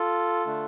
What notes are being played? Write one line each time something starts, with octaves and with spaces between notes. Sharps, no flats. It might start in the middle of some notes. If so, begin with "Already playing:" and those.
Already playing: F4 A4
D3 A3 D4